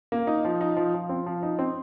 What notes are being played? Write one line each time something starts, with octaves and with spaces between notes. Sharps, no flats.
A#3
D#4
F3
D#4
F3
F3
C4
F3
D#4
C4